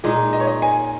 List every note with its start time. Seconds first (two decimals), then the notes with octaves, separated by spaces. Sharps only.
0.04 A#2 G#3 D#4 G#4
0.33 D#5
0.40 C#5
0.47 D#5
0.62 G#5